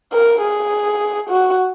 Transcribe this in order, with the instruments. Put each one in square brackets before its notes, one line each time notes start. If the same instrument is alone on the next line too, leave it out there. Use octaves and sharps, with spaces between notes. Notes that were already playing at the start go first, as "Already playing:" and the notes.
[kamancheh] A#4
G#4
F#4